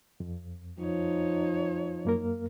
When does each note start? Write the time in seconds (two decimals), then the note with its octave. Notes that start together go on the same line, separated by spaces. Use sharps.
0.20 F2
0.79 F3 D#4 C#5
2.05 F#2 A#3 A#4